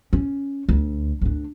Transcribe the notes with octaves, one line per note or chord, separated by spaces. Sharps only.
C#4
D2
D2 D4